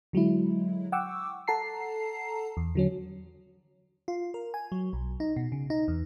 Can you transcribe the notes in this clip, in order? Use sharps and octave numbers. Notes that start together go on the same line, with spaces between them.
D3 F#3 G#3 E4
F#5 G5 C#6 D6 E6
A4 F#5 A5 A#5 C7
E2
D3 F#3 C#4
F4
A#4
G#5
F#3
B1
D#4
B2
C#3
D#4
E2